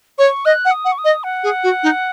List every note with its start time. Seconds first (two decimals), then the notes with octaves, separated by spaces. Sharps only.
0.18 C#5 C#6
0.45 D#5 F#6
0.65 F#5
0.71 D#6
0.85 F#5
0.92 C#6
0.98 D#6
1.05 D#5
1.24 F#5
1.44 G#4
1.64 F#4
1.83 D#4